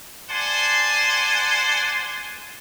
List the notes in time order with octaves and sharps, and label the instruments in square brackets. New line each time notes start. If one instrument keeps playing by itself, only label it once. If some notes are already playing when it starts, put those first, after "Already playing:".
[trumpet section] C5 D5 F#5 G#5 A5 C6